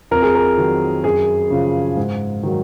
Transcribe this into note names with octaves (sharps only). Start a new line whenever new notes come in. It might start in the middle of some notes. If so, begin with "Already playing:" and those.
F2 A#4
G#4
A#4
D#3 F#3
F#2 G#4
C#3 F3
G#2
D#3 F#3